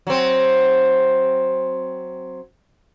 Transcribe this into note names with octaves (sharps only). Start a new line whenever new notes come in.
F#3 C4